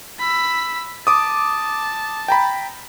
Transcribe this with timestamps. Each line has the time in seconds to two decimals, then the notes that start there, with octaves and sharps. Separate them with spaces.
0.19 B5 E6
1.07 A5 D6 D#6
2.28 G5 A#5 B5